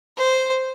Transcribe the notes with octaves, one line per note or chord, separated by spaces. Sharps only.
C5